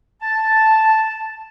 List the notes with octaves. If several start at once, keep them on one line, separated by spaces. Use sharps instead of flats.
A5